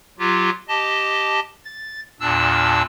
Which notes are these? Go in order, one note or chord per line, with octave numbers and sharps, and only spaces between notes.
F#3 F4 G4
G4 D#5 A5
A6
E2 A#2 D4 A5 E6